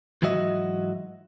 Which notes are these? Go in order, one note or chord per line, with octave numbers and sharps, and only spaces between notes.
G#2 E3 F#3 F#4 D#5 E5